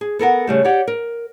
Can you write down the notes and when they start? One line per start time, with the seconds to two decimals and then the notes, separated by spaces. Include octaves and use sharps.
0.01 G#4
0.19 B3 A4 A#4 F#5
0.47 C#3 G3 A3
0.64 G4 C#5 D5 F#5
0.87 A#4